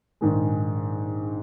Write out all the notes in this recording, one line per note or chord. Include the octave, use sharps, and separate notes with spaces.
A#1 G#2 D#3 G#3